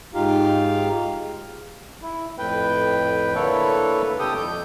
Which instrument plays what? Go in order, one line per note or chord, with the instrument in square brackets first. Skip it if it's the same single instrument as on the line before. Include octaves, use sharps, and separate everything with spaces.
[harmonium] G#2 D#4 F4 G4 F5
[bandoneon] E4
F2 A2 B4 G5
D3 A#3 E4 A4 B4 C#5
C3 G4 A4 G5 D#6
F2 G6